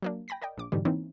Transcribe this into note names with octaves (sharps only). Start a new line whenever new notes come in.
F#3 A#3 D4
G5 G#5 B5 A#6 B6
A#4 D5 D#5 G5
A#1 D6
G#2 B2 D3 E3 G3
E3 A#3 C4 C#4 D#4 E4